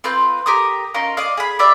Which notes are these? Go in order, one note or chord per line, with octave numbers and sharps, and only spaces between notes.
C4 F4 B4 G6
G4 A#4 D#6
C#4 D#4 F4 A#4
D5 D#5 F5
G#4 B5
G4 D5 E5 F5